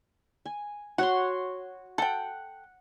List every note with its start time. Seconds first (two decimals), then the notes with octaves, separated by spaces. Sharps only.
0.46 G#5
0.98 F#4 C#5 F#5 C6
1.98 A4 F#5 G5